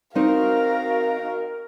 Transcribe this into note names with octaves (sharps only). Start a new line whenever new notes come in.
D#3 C4 D#4 F#4 A#4 F5